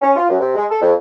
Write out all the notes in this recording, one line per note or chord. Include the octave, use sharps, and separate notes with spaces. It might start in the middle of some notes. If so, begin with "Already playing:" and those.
C#4
F4
F#2
C3
G#3
A4
F2